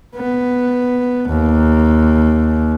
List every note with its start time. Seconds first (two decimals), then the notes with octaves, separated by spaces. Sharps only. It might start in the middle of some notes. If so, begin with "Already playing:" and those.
0.15 B3
1.29 D#2